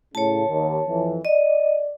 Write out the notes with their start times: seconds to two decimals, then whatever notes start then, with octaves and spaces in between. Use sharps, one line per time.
0.15 A2 C#3 C#5 A5
0.48 D#2
0.87 F2 E3
1.25 D5 D#5